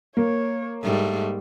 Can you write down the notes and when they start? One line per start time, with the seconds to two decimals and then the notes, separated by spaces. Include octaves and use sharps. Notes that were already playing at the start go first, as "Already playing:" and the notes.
0.17 A#3 C#5
0.83 G#2 G3 A3